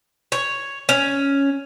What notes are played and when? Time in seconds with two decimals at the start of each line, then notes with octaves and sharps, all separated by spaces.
0.32 C#5
0.89 C#4